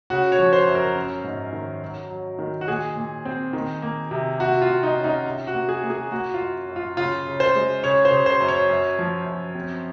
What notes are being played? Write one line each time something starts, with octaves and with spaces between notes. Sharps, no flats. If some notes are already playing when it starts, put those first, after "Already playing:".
C#3 F#4
C#5
F3
C5
F#2
A#4
C#4
G#2
D#3
F#3
F#3
D#3
F#4
A#2 G#4
A#2
C4
D#3
A#3
C3
C3 F#4
F4
C3
D#4
C#4
D#4
C3
F#4
A#3
G#4
A#3
G#4
A#3 F#4
F4
F#2
F#2
F4
C#3 F4
C#3
C5
G#3
C#3 C#5
C5
C#3
C5
F#2
C#5
F#2
F3
F#2
C4